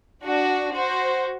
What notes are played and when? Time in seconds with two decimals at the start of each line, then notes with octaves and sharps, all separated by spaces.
0.25 D4 F#4
0.74 F#4 C5